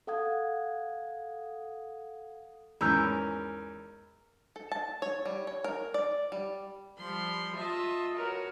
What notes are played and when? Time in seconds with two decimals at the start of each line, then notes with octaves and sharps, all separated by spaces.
0.07 A4 F5 F#5 D#6 G#6
2.81 E2 G#2 C#4 A#4 B5 E6 G6
4.56 A4
4.72 A5
5.02 C#5
5.26 G3
5.47 C#5
5.64 A#4
5.94 D5
6.32 G3
6.99 F3 G3 B5 C6
7.57 F4 D#5 E5 A5
8.15 F#4 A#4 B4 C#5